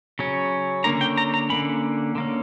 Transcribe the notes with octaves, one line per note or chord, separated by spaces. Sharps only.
C#3 F#3 C#4
D3 A#3 C#4 A#5
G5
A#5
A#5
D3 A#3 C#4 B5
D3 A#3 C#4